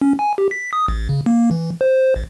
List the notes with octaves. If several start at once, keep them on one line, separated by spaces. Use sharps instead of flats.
C#4
G#5
G4
B6
D#6
A1
C#3
A#3
E3
C5
A1